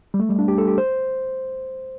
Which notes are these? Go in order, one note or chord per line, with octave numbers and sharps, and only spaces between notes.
G3
A3
G3
D4
G4
A4
G4
C5